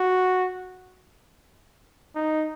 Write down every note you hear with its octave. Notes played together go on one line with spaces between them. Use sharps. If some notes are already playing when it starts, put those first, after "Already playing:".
Already playing: F#4
D#4